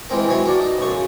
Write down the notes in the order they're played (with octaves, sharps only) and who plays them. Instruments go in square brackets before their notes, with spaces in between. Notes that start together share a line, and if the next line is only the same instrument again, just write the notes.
[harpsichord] E3 G#3 C4 A#4
C3 E3 F#3 C#5 G#5
D4 F#4 A#4
D#4
B1 F#2 C#6
C#3